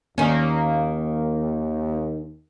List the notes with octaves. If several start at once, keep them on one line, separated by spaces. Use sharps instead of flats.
D#2 D#3 A#3 C#4